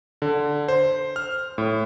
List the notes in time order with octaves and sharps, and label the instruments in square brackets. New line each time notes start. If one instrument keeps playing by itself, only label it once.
[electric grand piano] D3
C5
F6
A2